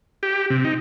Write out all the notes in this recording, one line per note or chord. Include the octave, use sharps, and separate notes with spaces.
G4
C3
D#4